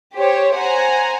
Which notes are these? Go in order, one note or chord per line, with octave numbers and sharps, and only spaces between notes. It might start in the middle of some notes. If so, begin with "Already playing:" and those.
G4 C5 C#5
C5 F#5 G#5 A#5